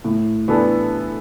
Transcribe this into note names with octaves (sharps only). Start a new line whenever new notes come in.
A2
E3 B3 D4 A4